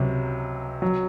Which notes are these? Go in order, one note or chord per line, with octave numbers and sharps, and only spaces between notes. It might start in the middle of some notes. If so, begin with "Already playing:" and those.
Already playing: C#2 C3 F#3
F#3